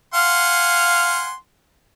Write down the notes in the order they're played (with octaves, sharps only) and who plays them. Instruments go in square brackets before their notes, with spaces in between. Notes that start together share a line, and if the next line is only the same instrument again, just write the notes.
[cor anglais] F5 [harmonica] F#5 G#5 C6